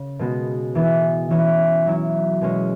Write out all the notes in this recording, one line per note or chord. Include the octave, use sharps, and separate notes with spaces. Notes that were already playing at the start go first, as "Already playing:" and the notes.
Already playing: C#3
B2 G#3 B3 F#4
E3 B3 E4
E3 C#4 E4
F#3 C#4 E4
B2 G#3 C#4